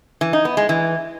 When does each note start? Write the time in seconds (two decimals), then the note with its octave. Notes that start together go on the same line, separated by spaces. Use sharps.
0.21 E3
0.33 D#4
0.45 B3
0.57 G#3
0.69 E3